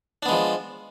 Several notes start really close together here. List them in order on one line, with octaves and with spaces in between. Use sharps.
D4 B3 G#3 F3